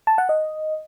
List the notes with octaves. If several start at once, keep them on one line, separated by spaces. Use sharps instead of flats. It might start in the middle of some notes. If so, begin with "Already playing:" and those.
A5
F#5
D#5